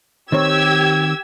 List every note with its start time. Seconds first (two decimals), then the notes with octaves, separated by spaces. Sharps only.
0.32 D#3 C4 G4 C#5 E6 G#6